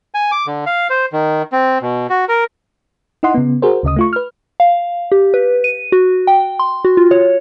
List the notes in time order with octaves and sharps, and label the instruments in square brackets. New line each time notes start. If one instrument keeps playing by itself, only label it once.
[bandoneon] G#5
D6
D3
F5
C5
D#3
C4
B2
F#4
A#4
[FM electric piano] D#4 E4 D#5 F#5 C6
C#3 B3
F#4 G#4 A#4 C5
D2 C#3 D#5 D#6
A3 F4 C#6
B4 F6
[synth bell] F5
G4
B4
D#7
F#4
G5
C6
F#4
F4
C#5